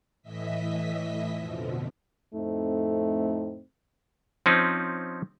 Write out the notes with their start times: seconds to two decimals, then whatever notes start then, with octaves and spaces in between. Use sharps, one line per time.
0.22 A2 E3 D#5 E5 B6
1.38 F2 B2 D3 F3
2.35 F2 A2 A3 C4 D#4
4.46 F3 C4 C#4 D#4